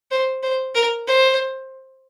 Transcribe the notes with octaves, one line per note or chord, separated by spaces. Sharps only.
C5
C5
A#4
C5